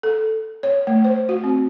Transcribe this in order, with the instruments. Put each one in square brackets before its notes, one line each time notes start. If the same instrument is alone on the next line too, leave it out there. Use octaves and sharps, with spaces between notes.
[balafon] A4
C#5
A3
C5
F#4
C4